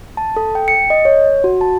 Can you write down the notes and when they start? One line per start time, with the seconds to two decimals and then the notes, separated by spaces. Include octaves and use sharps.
0.17 A5
0.37 A4
0.55 G5
0.68 C#7
0.90 D#5
1.05 C#5
1.44 F#4
1.61 A5